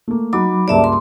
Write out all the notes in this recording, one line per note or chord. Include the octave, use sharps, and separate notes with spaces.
A3 A#3
F#3 D#4 F#4 B5 D6
C#2 G2 A#3 D5 E5 A5
C6